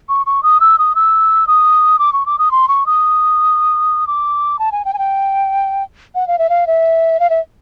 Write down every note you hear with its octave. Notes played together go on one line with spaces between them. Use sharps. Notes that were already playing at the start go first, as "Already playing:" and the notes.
C#6
C#6
D#6
E6
D#6
E6
D#6
D6
C#6
D6
D#6
C6
C#6
D#6
D6
A5
G#5
G5
G#5
G5
F#5
F5
E5
F5
E5
F5
E5